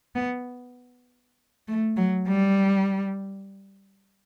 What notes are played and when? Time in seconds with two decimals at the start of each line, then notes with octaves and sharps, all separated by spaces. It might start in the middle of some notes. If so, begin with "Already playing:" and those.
0.15 B3
1.68 A3
1.97 F#3
2.28 G3